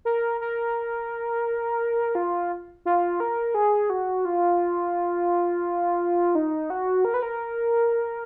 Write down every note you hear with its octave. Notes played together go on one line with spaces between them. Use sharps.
A#4
A#4
F4
F4
A#4
G#4
F#4
F4
D#4
F#4
A#4
B4
A#4